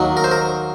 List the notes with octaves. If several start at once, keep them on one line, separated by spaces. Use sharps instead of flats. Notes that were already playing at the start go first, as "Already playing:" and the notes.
Already playing: D#2 D#3 F#3
A#4
C5
A#4